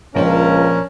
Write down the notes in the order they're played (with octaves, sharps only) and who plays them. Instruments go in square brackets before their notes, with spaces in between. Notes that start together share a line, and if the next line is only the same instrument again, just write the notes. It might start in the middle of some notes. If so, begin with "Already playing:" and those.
[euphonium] C#2 [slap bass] A#2 F3 [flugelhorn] C#4 [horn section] D4 A#4